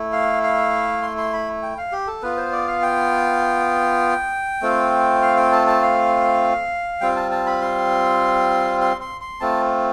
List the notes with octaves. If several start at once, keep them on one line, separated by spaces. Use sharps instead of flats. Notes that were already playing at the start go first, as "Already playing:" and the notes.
Already playing: A3 E4
F5
F5
C6
C6
B5
G5
F5
G4
A4
B3 F4 B4
C5
D5
F5
G5
A3 C4 F4
F5
G5
A5
A5
F5
G3 C4 F4 G5
A5
A5
B5
C6
C6
C6
C6
A3 C4 F4 A5